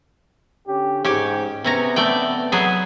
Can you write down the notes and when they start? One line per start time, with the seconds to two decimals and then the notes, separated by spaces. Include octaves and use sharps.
0.67 D3 C#4 G4
1.05 G#2 C#4 G4
1.64 C3 B3 C#4 A#5
1.96 A3 D5 G5
2.52 F#3 B3 G#4